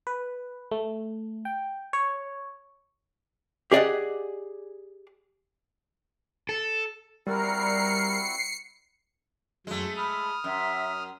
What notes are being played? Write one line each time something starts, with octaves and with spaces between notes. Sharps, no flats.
B4
A3
G5
C#5
G4 G#4 D5 D#5 F#5
A4
G3 C4 E4 F#4 A#4 C7 C#7
F#2 F#3 G#3 A3
B5 D#6 F6
F#2 E5